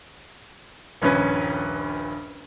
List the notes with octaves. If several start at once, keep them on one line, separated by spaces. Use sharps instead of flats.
D#1 A#1 G2 C#4 B4